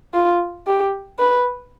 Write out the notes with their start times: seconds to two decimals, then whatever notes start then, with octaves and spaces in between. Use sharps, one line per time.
0.14 F4
0.67 G4
1.19 B4